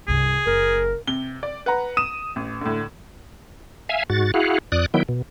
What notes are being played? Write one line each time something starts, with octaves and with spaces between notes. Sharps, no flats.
C2 G2 G#4
F#1 A#4
C3 G7
D5
B4 F#5 A#5
D#6 D#7 E7
A1
A2 D3
E5 F5 G#5
G#2 F#4 A6
E4 F#4 G#4 F5 F#5
F2 D5 D#6 F#6
D#3 F#3 B3 E4 G5
B2